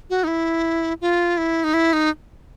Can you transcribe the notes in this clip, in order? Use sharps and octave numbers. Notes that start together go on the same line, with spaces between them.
F#4
D#4
E4
F4
E4
D#4
E4
D#4